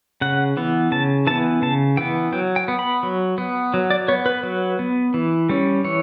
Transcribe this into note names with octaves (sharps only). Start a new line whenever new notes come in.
C#3 F#5
E3 B3
C#3 A5
E3 B3 A5
C#3 A5
E3 B3 G5
F#3 G5
G5
B3
B5
F#3
B3
F#3
D5
B3 C#5
B4
F#3
B3
E3
G3 C#4
E3 C#5